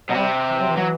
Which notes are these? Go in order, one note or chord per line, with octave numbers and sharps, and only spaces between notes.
B2 F#3
C3 G3
E3
F#3
E3
F#3